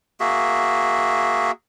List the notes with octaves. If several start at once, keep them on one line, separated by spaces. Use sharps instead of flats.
A#3 F#4 G#4 E5